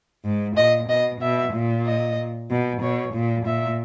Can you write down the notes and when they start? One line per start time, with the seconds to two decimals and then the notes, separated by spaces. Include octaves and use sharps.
0.25 G#2
0.57 A#2 D#5
0.89 B2 D#5
1.21 B2 E5
1.54 A#2
1.86 D#5
2.50 B2
2.82 B2 C#5
3.15 A#2
3.46 A#2 E5